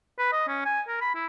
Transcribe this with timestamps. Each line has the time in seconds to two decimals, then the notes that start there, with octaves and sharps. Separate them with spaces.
0.19 B4
0.33 D#5
0.48 C#4
0.65 G#5
0.88 A#4
1.01 B5
1.15 E4